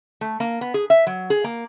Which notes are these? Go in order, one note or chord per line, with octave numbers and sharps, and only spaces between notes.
A3
A#3
B3
G#4
E5
F#3
G#4
A#3